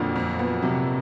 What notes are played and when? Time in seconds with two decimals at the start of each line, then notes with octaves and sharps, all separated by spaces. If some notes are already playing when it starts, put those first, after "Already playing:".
Already playing: F2 A#2 D3 F#3
0.16 F2
0.39 B3
0.62 C3 F#3